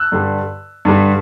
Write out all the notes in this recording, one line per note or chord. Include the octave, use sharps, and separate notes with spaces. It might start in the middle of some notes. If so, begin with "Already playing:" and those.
Already playing: E6 F#6
G2 D3 G3
G2 D3 G3